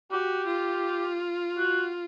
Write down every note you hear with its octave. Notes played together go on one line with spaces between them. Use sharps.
F#4 G4
F4
F#4